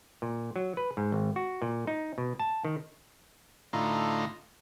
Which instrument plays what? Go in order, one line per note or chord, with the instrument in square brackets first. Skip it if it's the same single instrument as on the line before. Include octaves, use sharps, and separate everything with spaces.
[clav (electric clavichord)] A#2
F#3
B4
G#2
G#1
F#4
A#2
D#4
B2
A5
D#3
[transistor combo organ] A2 D3 D#4 F4 A#5